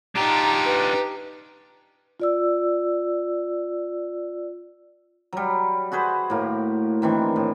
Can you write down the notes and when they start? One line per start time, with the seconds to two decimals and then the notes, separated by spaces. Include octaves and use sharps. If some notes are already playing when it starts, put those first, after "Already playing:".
0.16 D4 D#4 F4 G4 A#5
0.65 B4
2.20 F4 D5 E6
5.33 F#3 G3
5.92 F#4 G#4 B4 C5
6.30 A2 A#3
7.02 D#3 E3 C4 D4
7.36 A2